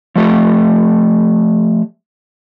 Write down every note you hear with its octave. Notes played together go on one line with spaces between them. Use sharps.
F3 A3 G4